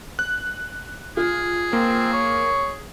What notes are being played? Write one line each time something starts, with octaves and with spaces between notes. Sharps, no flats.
F#6
F4 G#4
A#3 C4
C#5